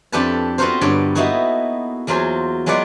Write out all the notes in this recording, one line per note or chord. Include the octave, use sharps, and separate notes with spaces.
F2 D4 G4 A4 B4 A5
B3 C4 F4 F#4 A#4 C5
G2 D3 C#5 D5
A#3 B3 D#4 E4 F#4 A4
E2 F#3 A#3 F4 C5 G#5
F#3 G#3 F4 B4 D5 F#5